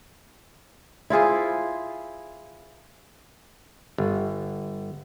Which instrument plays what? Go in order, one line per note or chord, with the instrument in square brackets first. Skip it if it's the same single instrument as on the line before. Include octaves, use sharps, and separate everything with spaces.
[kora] E4 F4 G#4 C5
[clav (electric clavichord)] G1